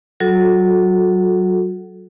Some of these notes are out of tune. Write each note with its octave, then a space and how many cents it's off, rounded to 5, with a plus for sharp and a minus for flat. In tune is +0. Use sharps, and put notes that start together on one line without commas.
F#3 +20 F#4 -35 A4 -15